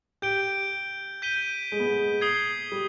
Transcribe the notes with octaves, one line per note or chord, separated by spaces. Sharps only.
G4 G6 D7 G7
G6 B6 D#7 G7
G#3
B3
G#3
D#6 G#6 C7 G7
G3